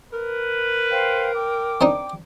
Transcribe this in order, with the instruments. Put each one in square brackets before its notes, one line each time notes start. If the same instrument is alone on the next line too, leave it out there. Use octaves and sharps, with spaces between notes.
[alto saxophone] A#4 [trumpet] B4
[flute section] C5 F5 G5
G5 D6
[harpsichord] C4 D4 D#4